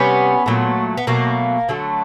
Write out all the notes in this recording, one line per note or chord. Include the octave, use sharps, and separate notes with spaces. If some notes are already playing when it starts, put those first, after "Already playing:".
Already playing: C3 G3 B3 C#4
A#2 F#3 A3
B3
B2 F#3 A3 A#3
D3 F#3 A3